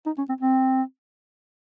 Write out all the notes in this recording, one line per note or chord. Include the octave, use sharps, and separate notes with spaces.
D#4
C#4
C4
C4